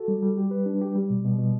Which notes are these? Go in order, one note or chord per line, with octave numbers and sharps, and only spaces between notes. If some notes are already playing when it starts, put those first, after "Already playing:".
Already playing: F#4 A4
G3
G3
G4
B4
D4
G4
G3
B2
B2
B2